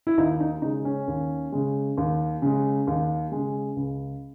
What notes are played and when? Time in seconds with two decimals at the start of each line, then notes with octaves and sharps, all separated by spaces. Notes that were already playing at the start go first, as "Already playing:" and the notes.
0.07 E4
0.18 D#2 D#4
0.40 D#4
0.62 C#3 G#3 D#4
0.85 C#4
1.08 D#2
1.52 C#3 G#3
1.97 D#2
2.42 C#3 G#3
2.87 D#2
3.32 C#3 G#3
3.76 C#2